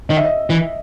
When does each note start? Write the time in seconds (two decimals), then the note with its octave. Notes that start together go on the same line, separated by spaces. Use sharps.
0.09 D#3 D#5
0.17 E5
0.24 D#5
0.50 E3